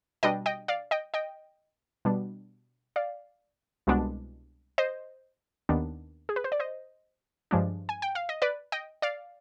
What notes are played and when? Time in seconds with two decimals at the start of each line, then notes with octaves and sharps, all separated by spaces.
0.23 B2 G3 D4 D#5 G5
0.46 D#5 G5
0.68 D5 F5
0.91 D#5 G5
1.14 D#5 G5
2.05 B2 G3 B3 D4
2.96 D5 F5
3.87 C2 B2 G#3 B3 D4
4.78 C5 D#5
5.69 D#2 D#3 B3 D4
6.29 G#4
6.36 B4
6.44 C5
6.52 D5
6.60 C5 D#5
7.51 G2 F3 G#3 D4
7.89 G#5
8.02 G5
8.15 F5
8.29 D#5
8.42 B4 D5
8.72 D#5 G5
9.02 D5 F5